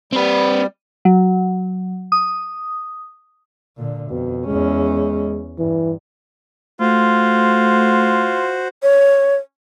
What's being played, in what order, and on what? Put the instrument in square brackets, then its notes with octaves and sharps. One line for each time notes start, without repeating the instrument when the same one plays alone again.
[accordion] G3 [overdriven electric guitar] C4 B4
[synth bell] F#3
D#6
[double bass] A#2 D3
[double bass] F2 [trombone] B2
[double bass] E2 C#4 [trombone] G#3
[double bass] G2 [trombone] E3
[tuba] A3 [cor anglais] F4 [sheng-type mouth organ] F#4 C5
[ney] C#5